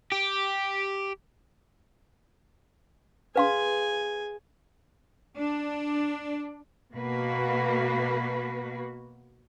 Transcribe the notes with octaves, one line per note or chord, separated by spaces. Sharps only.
G4
G#4 B4 F5 G#5 C6
D4
B2 A#3 F#4 B4 F5